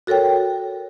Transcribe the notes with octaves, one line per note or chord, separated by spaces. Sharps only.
F#4 A4 A#4 C#5 G5